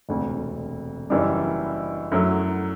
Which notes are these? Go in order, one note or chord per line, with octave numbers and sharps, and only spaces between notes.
E1 D2 C3
F#1 F#2 E3 G3 D4
F#2 F#3 A3 E4